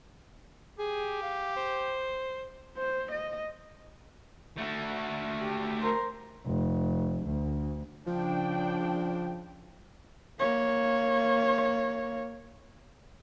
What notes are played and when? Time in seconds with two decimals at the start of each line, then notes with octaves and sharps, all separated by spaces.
0.79 G4 G#4
1.22 F5
1.56 C5
2.77 C5
3.12 D#5
4.57 A3 F#4
5.42 G4
5.81 A#4 C5
6.46 F1
7.25 D2
8.07 C#3 F3 D4 G5
10.39 A#3 C#5